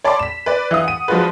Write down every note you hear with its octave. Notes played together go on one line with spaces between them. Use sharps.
C#5 D5 A5 B5 C6 D6
B6 E7
B4 D5
E3 E4 F5 D#6
F#5 D#7
F3 G#3 D4 F4 F#4 B4